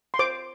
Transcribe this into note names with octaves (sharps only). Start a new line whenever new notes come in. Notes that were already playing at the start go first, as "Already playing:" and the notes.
C6
C5 D6